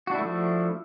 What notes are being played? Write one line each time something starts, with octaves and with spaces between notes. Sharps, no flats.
F3 A3 D4 E4 F#4